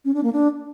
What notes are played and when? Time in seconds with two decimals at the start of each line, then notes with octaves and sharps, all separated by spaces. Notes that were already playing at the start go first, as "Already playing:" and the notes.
0.05 C#4
0.14 D4
0.24 A#3
0.33 D4